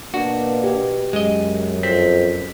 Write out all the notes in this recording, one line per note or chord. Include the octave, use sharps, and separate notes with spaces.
B2 A#3 D4 F#4
G4
F#2 G#3 D#5
F2 C4 B6